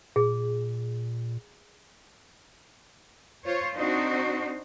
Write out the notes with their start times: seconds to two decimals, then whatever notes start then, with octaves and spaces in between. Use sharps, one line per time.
0.16 A#2 G#4
3.45 F4 C5 C#5
3.76 C4 D4 D#4 F#4 C5